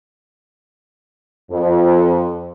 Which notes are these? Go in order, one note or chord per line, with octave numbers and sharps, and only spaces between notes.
F2